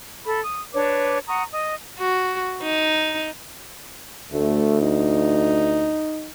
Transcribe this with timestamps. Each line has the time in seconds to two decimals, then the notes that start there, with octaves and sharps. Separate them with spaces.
0.25 A4 B5
0.44 D#6
0.74 D4 B4 C#5 D6
1.28 F#5 A#5 C#6 D#6
1.52 D#5 D#6
1.99 F#4
2.63 D#4
4.33 D2 A3
4.82 D#4